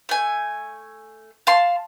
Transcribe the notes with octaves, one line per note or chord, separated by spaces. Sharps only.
A3 G#5
F5 A5 C6